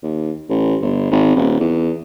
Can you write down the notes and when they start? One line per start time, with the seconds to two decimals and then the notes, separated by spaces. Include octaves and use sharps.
0.03 D#2
0.49 A1
0.82 G1
1.11 G#1
1.37 D#1
1.60 E2